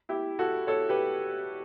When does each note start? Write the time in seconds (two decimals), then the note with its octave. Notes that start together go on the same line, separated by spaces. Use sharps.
0.09 E4 G4
0.39 F#4 A4
0.67 A4 C#5
0.89 G4 B4